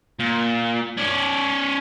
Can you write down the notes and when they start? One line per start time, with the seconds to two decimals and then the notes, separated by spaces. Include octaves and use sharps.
0.20 A#2
0.97 C#4 D5